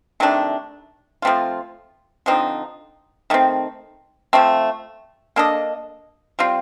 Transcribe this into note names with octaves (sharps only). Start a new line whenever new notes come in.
C3 D#3 A3 D4
F3 A3 C4 F4
D3 F3 C4 D#4
D#3 A3 C4
F3 A3 C4
A#3 D4 A4 D#5
G3 C4 F4